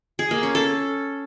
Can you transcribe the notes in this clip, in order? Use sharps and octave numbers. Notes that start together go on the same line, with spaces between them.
G#4
A#3
C#4
A4